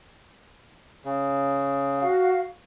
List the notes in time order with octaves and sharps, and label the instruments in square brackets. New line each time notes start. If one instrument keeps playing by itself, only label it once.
[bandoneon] C#3
[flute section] F#4 F5